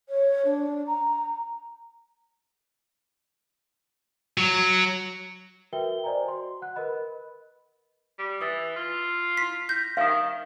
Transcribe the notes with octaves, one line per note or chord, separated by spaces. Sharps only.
C#5
D4
A#5
F#3
F#4 A#4 B4 E5 G5 G7
C5 D5 D#5 G#5 A#5
F#4 C6
F#5 F#6
A#4 B4 D#5 B5
G3
E3 D#6 E6 A6
F4
E4 C6 B6
G6 A#6 B6
D#3 E5 F5 D#6